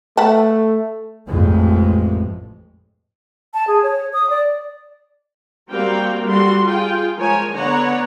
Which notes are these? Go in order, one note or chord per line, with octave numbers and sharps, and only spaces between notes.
A3 B4 F#5 A5
A1 F2 A2 C3 G#3
A5
G#4
C#5
D#6
D5
G3 A#3 C4 F#4 F5 G5
G3 F#4 A4 C6
F4 G#4 G5
F3 G#3 A#4 C#5 G#5
D3 B3 C#5 D5 F#5 A#5